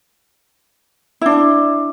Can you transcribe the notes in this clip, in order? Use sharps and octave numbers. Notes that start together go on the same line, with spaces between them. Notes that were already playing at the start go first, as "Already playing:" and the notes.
D4 E4